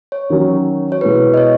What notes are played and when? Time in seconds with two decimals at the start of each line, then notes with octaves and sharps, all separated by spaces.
0.12 C#5
0.30 D#3 F#3 C#4
0.92 C#5
1.01 B2 G#3 B3 E4 B4
1.34 D#5
1.37 C#5